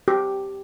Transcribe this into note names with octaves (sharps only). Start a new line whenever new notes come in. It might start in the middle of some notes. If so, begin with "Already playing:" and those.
G4